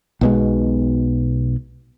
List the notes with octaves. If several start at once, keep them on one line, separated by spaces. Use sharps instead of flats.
B1 B2 G#3